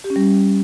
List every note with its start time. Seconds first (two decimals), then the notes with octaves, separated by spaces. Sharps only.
0.04 G4
0.10 C#4
0.16 G3